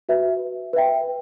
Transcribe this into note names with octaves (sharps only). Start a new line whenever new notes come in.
F#4 B4 E5
B4 E5 G5